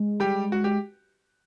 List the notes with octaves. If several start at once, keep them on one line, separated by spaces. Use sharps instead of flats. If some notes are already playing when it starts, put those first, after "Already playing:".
Already playing: G#3
G3 G4
F#4
G4